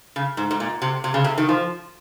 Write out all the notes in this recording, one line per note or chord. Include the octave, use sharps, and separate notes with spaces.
C#3
G#2
G#2
A#2
C3
C3
C#3
C3
D#3
F3